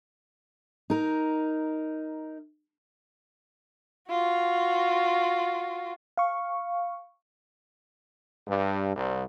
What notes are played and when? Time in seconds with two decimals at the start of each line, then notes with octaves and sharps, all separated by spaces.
0.90 D#4 A#4
4.09 F4 F#4
6.17 F5 C#6
8.48 G2
8.96 C2